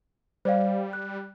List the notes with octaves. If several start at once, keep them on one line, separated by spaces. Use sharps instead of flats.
G3 C5 D5 F5
F#6